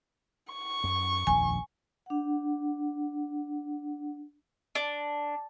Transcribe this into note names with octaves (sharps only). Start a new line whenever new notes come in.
C#6
F#2
D#1 A#1 F2 G#5
D4 F#5
D4